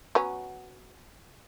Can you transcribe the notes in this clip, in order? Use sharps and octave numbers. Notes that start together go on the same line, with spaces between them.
F#3 B3 C#4